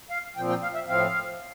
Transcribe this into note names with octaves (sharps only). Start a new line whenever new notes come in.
F5
A#2 F3 C4 G5
G5
F5
E5
A2 F3 C4 F5